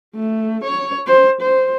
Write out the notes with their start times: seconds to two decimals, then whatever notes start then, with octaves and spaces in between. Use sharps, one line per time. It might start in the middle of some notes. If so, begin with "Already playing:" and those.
0.15 A3
0.65 C#5
1.07 C5
1.42 C5